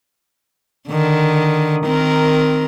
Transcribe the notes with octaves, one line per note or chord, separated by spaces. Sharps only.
D3 D#3
D#3 C4 A#4